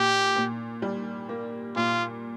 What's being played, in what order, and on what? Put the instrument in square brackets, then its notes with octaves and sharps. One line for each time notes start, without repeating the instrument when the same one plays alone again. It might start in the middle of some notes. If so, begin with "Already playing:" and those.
Already playing: [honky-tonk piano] A#2 [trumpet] G4
[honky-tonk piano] A#2
G3
A#3
[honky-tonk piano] A#2 [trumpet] F4